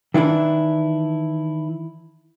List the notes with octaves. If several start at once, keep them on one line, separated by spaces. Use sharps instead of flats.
D#3 E3 D4 E4